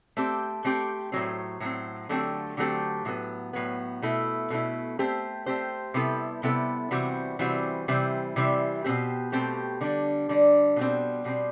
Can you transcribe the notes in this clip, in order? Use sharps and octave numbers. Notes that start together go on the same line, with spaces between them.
A3 C4 G4
A3 C4 G4
A2 F#3 C4
A2 F#3 C4
D3 F#3 A3 C4 G4
D3 F#3 A3 C4 G4
A2 F#3 B3
A2 F#3 B3
B2 A3 E4
B2 A3 E4
A3 C4 G4 C5
A3 C4 G4 C5
C3 G3 B3 E4 A4
C3 G3 B3 E4 A4
C3 E3 G3 C4 F#4
C3 E3 G3 C4 F#4
C3 E3 G3 C4 E4
C3 E3 G3 C4 E4
B2 A3 C4 G4
B2 A3 C4 G4
D3 G3 D4
D3 G3 D4
B2 G3 C4
B2 G3 C4